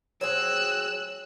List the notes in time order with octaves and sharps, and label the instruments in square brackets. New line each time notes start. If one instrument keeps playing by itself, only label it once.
[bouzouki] F#3 C4 G#4 [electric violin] E6 F#6